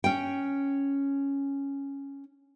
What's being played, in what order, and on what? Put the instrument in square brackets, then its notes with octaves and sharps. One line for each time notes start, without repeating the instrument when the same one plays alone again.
[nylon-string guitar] C#4 G5